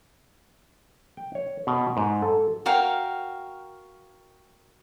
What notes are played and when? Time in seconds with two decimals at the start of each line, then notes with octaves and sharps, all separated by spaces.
1.17 G5
1.35 C#5
1.67 B2
1.97 G#2
2.22 A4
2.66 F#4 A#4 F5 G5